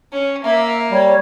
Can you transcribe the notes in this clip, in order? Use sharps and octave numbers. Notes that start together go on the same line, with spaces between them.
C#4
A#3 E5
G3 C#5